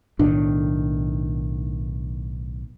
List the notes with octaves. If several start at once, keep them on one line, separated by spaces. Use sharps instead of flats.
B1 A2 D#3 D4